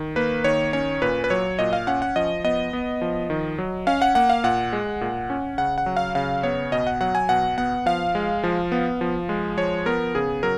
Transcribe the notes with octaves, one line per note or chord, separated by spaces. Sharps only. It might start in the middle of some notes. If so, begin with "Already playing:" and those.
Already playing: D#3
A#3 B4
D#3 C#5
C#4 C#5
A#2 B4
B4
F#3 C#5
A#2 D#5
F5
C#4 F#5
F#5
F3 D#5
B3 D#5
B3
F3
D#3
F#3
C#4 F5
F#5
A#3 F#5
F5
A#2 F#5
G#3
A#2
C#4
C#3 F#5
F#5
F#3
F5
C#3 F5
B3 C#5
B2 D#5
F#5
F#3 F#5
G#5
B2 F#5
B3 F#5
F3 F5
G#3
F3
B3
F3
G#3
F3 C#5
B3 A#4
C#3 G#4
F#3 A#4